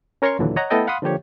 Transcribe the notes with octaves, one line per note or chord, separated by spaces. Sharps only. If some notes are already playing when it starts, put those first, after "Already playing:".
C#4 A#4 C#5 A#5 C6 C#6
D#2 A#2 D3 E3 F#3
C#5 D#5 F#5 A#5
A3 B3 E4 A4 D#5 G5
F5 F#5 B5 C6 D#6
D3 F3 A#3 G4 C#5